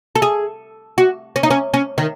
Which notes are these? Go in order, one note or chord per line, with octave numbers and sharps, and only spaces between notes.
A4
G#4
F#4
C#4
D#4
C#4
C#4
D#3